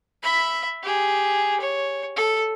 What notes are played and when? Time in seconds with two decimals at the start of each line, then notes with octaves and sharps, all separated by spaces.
0.23 E5 B5
0.83 G4 G#4
1.60 C#5
2.16 A4